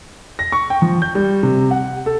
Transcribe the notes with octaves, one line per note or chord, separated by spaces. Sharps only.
A#6
C#6
G5
F3
G6
G3
C3
F#5
A4